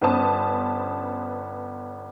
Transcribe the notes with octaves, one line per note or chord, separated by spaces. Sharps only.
G1 B3 C#4 C5 A5 D#6